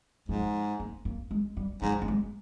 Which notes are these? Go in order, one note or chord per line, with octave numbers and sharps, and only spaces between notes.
G#2 F3
A#3
A#3
G#3
G3
G#2 F3
A#3
G#3